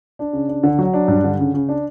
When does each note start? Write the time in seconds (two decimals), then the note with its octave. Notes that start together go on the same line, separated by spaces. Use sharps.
0.19 D4
0.33 C#3
0.48 D4
0.63 D3
0.79 F#3
0.93 D4
1.08 G2
1.24 D3
1.39 C#3
1.54 C#3
1.69 D4